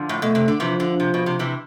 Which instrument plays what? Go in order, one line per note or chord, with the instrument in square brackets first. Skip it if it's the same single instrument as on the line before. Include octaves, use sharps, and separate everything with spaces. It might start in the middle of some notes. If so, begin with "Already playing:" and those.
Already playing: [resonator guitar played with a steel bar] D3 F3
A2
[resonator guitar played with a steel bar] B2 [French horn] A3
[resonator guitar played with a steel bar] C3
D3
[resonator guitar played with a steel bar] C3 E3 [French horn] F3
[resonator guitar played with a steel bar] D3
C3
B2
C3
C3 E3